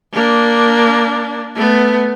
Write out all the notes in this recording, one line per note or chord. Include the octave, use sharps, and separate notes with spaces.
A#3 D4
A3 B3